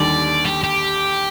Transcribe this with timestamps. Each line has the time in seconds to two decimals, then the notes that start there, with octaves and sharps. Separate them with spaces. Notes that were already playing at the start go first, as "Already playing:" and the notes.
Already playing: D#2 D3 G3 D5
0.45 G4
0.63 G4